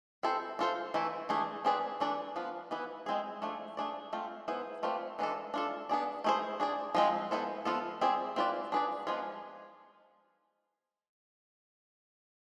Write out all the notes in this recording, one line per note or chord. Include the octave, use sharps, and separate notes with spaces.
C4 E4 A4 C5
D4 F4 A4 C5
E3 A3 E4
E3 A3 D4 G#4
C4 G#4 B4 D5
E3 A3 D4 A4 D5
F3 B3 F4
E3 B3 E4 B4
G#3 C4 E4 G#4
F3 A3 D4 A4
A3 D4 G#4 D5
A3 C4 F4
B3 E4 G#4 C5
A3 C4 F4 B4 D5
E3 G#3 D4 F4 A4
D4 F4 A4
B3 D4 G#4 D5
A3 E4 G#4 C5
D4 G#4 D5
F3 G#3 C4
B3 E4 A4 C5
F3 B3 F4 A4
C4 E4 G#4 D5
C4 F4 B4 D5
D4 G#4 B4 D5
F3 G#3 B3 F4 G#4